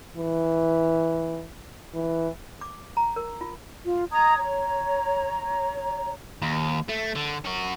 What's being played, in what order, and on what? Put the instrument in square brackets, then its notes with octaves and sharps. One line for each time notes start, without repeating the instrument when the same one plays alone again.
[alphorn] E3
E3
[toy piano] D6
A#5
A#4
F4
[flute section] F4
D#5 A#5 D#6 G#6
C#5 A#5
[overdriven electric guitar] D#2
A3
D3
C#4 F#4